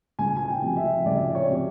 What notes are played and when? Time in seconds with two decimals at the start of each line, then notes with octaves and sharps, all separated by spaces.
0.19 C#2 G#5
0.36 G#5
0.48 G5
0.62 C3 F3
0.77 E5
1.05 C#2 D5
1.35 C#5
1.49 C3 F3